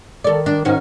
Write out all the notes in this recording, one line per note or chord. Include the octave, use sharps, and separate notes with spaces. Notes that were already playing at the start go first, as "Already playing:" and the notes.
D#3 A4 D5
D4
G#2 D#3 C#4 F#4